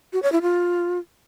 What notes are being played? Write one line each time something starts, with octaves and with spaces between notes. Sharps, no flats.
F#4
C#5
E4
F4